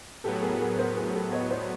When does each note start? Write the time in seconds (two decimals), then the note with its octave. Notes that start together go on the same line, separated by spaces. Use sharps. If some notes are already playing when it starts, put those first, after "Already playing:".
0.24 A2 F#3 B3 G4 A4
0.42 G#4 A#4
0.60 G#4 A#4
0.79 A#4 C5
0.96 G#4 A#4
1.14 G4 A4
1.33 C#5 D#5
1.51 C5 D5